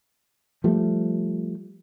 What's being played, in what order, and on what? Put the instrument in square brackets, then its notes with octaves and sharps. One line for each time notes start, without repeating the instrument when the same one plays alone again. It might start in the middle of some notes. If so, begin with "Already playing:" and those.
[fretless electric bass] F3 G3 A3